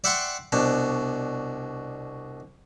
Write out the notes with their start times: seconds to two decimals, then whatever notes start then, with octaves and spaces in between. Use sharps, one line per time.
0.04 D5 E5 F#5 G5 C6 C#6
0.52 C2 B2 D4